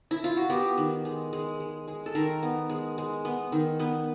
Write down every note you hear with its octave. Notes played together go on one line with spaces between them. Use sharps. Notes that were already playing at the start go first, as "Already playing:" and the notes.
E4
F4
F#4
B3 G4
D#3
G#3
G#3
G#3
G#3
A4
D#3 A#4
B3
G#3
G#3
B3
D#3
B3 B4